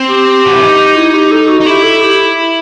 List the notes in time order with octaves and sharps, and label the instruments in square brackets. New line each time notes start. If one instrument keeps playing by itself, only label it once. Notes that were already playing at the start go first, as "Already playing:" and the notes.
Already playing: [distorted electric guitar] C4
[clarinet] G4
[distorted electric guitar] F#4
E4
D#4
[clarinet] E4
G4
A4
F#4
[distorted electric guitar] D#4
[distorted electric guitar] E4 [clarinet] G4
[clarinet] A4
G4